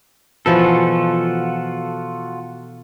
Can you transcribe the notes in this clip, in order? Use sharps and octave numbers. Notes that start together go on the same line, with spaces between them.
B2 E3 F3 F4 F#4 A4